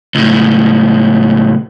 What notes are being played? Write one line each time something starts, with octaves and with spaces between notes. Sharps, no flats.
C#2 A2